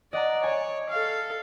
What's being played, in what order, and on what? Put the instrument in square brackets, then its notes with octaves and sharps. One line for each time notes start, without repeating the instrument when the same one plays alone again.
[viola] D5 [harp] D#5 F#5 A#5
[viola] C#5 [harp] D5 G#5
[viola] A4 F5